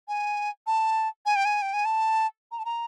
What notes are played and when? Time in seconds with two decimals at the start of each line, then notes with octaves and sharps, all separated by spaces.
0.08 G#5
0.67 A5
1.26 G#5
1.36 G5
1.45 G#5
1.62 G5
1.73 G#5
1.85 A5
2.52 A#5
2.59 A5
2.65 A#5